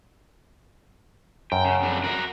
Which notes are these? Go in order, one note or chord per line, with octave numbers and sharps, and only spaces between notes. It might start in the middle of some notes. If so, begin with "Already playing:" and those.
F#2 G5
C#3
F2 C#3 D4
F#4 A#4